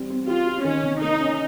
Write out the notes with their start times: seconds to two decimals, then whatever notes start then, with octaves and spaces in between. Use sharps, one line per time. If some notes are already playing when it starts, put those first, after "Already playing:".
Already playing: G3 C4
0.10 C4
0.27 F4 G4
0.46 G4
0.64 D#3 C#4
0.83 C3
1.01 A#3 D#4
1.19 C#4